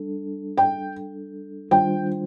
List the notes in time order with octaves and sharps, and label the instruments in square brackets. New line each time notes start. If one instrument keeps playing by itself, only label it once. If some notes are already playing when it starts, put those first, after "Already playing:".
Already playing: [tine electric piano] G3 D4 A4
[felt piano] G5
[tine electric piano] D#3 G3 D4 F4 C5 [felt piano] G5